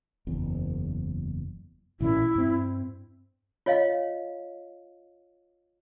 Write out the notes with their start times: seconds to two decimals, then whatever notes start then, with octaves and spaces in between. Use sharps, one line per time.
0.27 F#1 E2
2.00 A1 A#2 C#4 E4
2.36 G2 C4
3.66 F4 C#5 D#5 F5